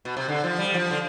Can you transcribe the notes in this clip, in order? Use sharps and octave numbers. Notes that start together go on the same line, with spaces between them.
B2
C3
D3
F3
G3
F3
D3